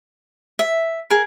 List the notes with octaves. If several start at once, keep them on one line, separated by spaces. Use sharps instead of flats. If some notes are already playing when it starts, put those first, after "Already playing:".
E5
G#4 A#4